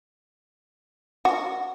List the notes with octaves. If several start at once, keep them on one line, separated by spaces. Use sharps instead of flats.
F#4